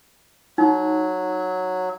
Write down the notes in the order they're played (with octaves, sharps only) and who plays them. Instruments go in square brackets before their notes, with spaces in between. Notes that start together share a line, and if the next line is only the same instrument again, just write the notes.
[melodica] F#3 [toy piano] D#4